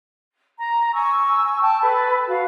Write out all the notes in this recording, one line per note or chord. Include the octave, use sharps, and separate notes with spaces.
A#5
G#5 C#6 E6
G5 A5
A4 B4 B5
F#4 F5